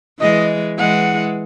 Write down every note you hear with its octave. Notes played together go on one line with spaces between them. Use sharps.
E3 G#3 D#5
E3 G#3 F#5